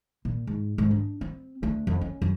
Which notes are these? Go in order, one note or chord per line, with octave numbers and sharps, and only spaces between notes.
A#2
G#2
G#2
D4
C4
D2
F2
C#4
F#2